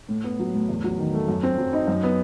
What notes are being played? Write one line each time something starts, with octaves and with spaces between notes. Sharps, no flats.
A2
B3
F#3
A2
E2
F#3
D#3
A3
F#2
C4
F#3
D#4
F#2
B3